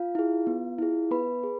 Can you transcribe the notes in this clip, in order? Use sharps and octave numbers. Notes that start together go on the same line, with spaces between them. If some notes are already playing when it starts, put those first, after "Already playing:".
Already playing: F4 F5
E4 G#4
B3
E4 G#4
B3 B4 B5
G#4